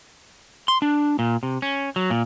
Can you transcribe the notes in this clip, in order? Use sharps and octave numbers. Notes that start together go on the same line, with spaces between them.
C6
D4
A#2
C3
C#4
F#3
A#2